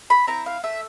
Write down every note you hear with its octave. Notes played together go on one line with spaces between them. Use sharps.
B5
C4 E4 A#5
F5
A3 E5